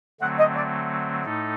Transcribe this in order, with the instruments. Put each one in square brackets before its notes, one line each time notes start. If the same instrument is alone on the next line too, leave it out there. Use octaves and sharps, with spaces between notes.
[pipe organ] D3 F#3 A3 C4 [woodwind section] F#5
[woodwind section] D#5
D5
[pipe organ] A2 A3 D#4 A4